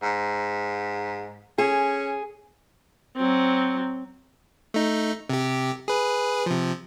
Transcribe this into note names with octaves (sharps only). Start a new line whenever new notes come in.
G#2
C#4 G#4
F#3 C4
A3 D#4
C3 G4
G#4 B4
C3 F3